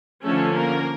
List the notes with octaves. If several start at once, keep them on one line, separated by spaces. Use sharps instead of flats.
D3 F3 A3 C#4 A4
A#3 A#4